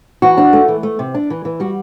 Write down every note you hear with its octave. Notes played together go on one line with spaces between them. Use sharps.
E3 F#4
D4
A3
E3
A3
C3
D4
E3
E3
G3 F#4